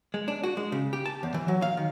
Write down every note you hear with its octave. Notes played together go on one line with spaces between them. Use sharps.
G#3
D4
F#4
G#3
C#3
G4
A5
E2
E3
F#3
F5
D#3